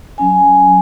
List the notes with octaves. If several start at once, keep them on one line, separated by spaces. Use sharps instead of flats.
F#3 C#4 G#5